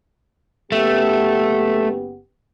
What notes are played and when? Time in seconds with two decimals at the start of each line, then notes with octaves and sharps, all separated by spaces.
0.72 F#1 A3 B3 G4